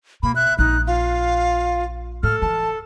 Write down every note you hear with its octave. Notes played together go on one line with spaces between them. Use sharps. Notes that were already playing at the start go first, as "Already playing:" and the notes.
B2 A#3 B5
E5 F#6
A#1 D#4 F#6
F4 F5
A2 A4 F6
E3 A5